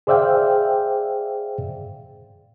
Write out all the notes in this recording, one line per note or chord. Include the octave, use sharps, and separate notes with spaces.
G#4 C5 D5 E5 F5 G5